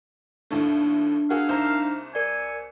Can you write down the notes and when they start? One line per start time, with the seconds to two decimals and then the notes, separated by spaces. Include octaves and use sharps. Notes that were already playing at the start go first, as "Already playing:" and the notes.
0.51 D#2 A2 A3 D4
1.30 F#4 G#4 A#4 F5
1.49 C2 D#4 C5 A#5 G6
2.15 A#4 D5 G#5 C#7